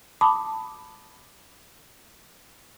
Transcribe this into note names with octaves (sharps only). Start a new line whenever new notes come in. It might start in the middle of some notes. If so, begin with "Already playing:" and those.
A5 B5 D6 D#6